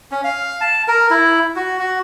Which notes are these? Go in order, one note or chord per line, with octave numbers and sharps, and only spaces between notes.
C#4
F5
A5
A#4
E4
F#4
F#4